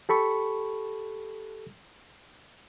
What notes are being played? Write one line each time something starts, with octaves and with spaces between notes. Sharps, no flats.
G4 A4 B5 C#6